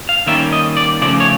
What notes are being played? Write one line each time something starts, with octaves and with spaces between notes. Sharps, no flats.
F5
D#3 G3 A#3 C#4 E5
D#5
D5
C#3 F3 A3 D5
C#5